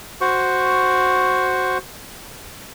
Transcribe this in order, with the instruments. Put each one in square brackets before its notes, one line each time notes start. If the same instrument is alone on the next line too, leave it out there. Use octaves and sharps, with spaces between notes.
[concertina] F#4 C5 C#6